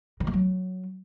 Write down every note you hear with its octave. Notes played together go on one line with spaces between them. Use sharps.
D#3
A#3
F#3